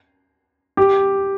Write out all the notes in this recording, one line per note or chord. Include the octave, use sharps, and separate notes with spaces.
G4